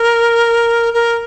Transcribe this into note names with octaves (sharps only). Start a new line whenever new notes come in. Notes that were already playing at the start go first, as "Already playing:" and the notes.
Already playing: A#4
A#4